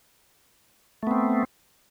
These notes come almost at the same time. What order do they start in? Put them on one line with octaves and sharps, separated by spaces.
A3 B3 C4